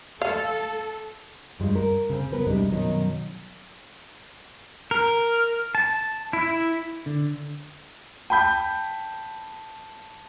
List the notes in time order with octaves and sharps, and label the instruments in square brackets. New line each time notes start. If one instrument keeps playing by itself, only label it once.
[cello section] A4 [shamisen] F5
[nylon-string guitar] G2 G#3 F4
A#4
C#3 C4
B3 A#4 B4
C3 G3 G#3 D4 D#4
F#2 B2 D#3 F#3 D#4
[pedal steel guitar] A#4
A5
E4
[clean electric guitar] D3
[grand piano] G5 B5 G6 [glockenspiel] A5